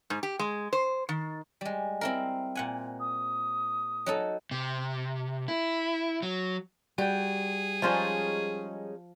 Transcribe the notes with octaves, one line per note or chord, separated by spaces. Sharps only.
G#2
G4
G#3
C5
D#3
G3 G#3
C4 E4 A#4
A#2 F#5 G#5
D#6
F#3 D#4 A4
C3
E4
F#3
G3 F#4 G#4 G5
F3 G#3 C#4 D#4 F4 C5